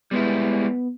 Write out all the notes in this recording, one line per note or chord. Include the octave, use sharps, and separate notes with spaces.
G3 G#3 B3 E4